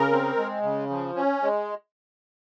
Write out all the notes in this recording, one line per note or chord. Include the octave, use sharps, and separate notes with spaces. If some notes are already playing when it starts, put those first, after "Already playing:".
Already playing: C#3 A#4
C4
G#3
C#3
F3
C#4
G#3